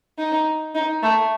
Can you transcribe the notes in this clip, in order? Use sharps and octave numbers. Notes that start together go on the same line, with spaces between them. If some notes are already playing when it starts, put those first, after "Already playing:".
D#4
D#4
A3